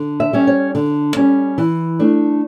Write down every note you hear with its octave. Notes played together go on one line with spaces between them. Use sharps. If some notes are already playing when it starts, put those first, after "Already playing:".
Already playing: D3
E5
G3 C#4
C#5
D3
G3 C#4
E3
A3 D4